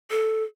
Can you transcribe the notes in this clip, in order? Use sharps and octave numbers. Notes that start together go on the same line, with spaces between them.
A4